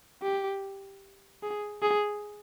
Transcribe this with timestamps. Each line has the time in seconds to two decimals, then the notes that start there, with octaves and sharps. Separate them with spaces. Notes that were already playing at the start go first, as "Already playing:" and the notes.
0.22 G4
1.42 G#4
1.82 G#4